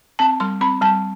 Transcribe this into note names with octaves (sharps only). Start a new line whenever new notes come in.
C4 A5
G3 C6
C4 B5
G3 A5